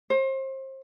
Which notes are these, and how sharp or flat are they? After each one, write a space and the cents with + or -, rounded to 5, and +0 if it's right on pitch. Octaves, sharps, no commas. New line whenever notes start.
C5 +30